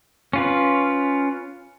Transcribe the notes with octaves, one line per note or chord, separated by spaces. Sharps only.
C#4 F4 B4